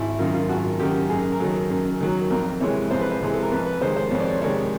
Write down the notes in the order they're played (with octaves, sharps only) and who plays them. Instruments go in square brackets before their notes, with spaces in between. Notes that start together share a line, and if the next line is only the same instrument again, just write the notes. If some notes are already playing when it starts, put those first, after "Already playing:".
Already playing: [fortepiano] G#1 E4
F#2 D#3 F4
F4
G#1 F#4
F#2 D#3 G4
F#2 G#4
A#4
D#3 F#3 A4
F#2
D#3 F#3
F2 A#4
C3 E3 G#3 C#5
F2 C5
B4
C5
C3 E3 G#3
A4
A#4
F2 B4
B4
C3 D#3 G#3 C5
C5
F2 C#5
D5
C#5
C3 D#3 G#3 C#5